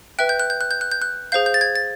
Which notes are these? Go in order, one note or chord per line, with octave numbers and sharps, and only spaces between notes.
B4 E5 G5 F#6
G6
F#6
G6
F#6
G6
F#6
G6
F#6
G#4 C5 F5 G6
G6
A6
G#6
A6